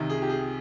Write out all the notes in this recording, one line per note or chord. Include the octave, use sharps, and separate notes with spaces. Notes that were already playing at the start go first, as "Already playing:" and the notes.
Already playing: C2 C3 D#3
G#4
G4
G#4